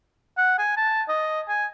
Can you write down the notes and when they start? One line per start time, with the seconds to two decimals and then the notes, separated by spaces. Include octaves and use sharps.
0.37 F#5
0.59 G#5
0.77 A5
1.09 D#5
1.48 G#5